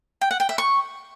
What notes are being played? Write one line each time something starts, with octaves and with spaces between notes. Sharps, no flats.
G5
F#5
G5
E5
C#6